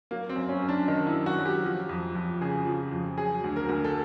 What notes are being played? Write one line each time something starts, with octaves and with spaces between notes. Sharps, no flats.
F#3 A#3
C4
F#2
C#4
F#2
D4
D#3 D#4
E4
F#3
F#4
F#2
G4
F3
F2
F2
C#3 G#4
F3
F2
F#3 G#4
D2
A#4
D2
A4